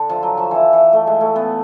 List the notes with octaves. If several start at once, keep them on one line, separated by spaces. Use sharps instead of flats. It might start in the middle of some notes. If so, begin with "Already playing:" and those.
Already playing: D3
F3
F#3
F3
E3
E3
A3
G#3
A3
B3